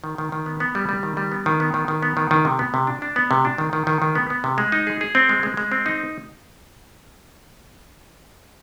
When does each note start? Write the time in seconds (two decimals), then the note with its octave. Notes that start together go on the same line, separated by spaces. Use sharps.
0.04 D#3
0.18 D#3
0.32 D#3
0.46 B3
0.60 B3
0.75 G3
0.89 G3
1.03 D#3
1.17 G3
1.32 B3
1.46 D#3
1.60 B3
1.74 D#3
1.88 D#3
2.02 B3
2.17 D#3
2.31 D#3
2.45 C3
2.59 B3
2.74 C3
2.87 D4
3.02 D4
3.16 B3
3.31 C3
3.45 D4
3.58 D#3
3.73 D#3
3.87 D#3
4.02 D#3
4.15 B3
4.30 B3
4.44 C3
4.58 G#3
4.72 D#4
4.87 G#4
5.01 G#4
5.15 C4
5.29 G#3
5.43 G#3
5.57 G#3
5.72 C4
5.86 D#4